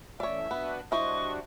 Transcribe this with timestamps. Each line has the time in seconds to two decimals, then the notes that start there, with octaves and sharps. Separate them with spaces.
0.20 E3 A3 C#4 C#5 D5 E5
0.51 B3 D4 F#4 B4
0.92 G3 D4 E4 F#4 C5 D#5 C#6